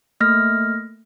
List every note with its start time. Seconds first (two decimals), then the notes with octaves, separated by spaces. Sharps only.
0.20 A3 A#3 F6 A#6